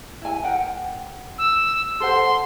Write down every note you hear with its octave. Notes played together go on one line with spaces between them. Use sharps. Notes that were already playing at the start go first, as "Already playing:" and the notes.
E4 G#5
A#4 F#5 G5
E6
A4 C5 F#5 C6